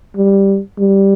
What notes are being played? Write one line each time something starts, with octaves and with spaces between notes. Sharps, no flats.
G3
G3